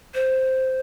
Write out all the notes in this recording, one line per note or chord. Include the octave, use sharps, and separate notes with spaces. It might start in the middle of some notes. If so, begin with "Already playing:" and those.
C5